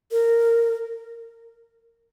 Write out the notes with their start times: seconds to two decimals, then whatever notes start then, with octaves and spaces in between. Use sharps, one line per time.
0.12 A#4